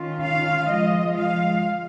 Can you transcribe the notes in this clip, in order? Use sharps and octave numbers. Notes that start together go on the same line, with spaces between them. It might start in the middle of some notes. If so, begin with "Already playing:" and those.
Already playing: D#3 C#4 F4
F5
F3 G#3 F4 D#5
F5